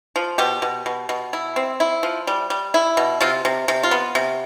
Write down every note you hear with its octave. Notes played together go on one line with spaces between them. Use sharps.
F3
B2 G4
B2
B2
B2
E4
C4
E4
F3
G3
G3
E4
B2
C3 F4
C3
C3
F4
B3
C3